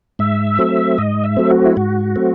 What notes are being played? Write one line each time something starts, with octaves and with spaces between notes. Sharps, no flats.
G#2 E5
F#3 A3 C4
G#2 D#5
E5
F#3 A3 C4
F#4
E4
G#2 F#4
F#3 A3 C4